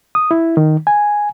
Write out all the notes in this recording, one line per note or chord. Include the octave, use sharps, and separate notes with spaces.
D#6
E4
D#3
G#5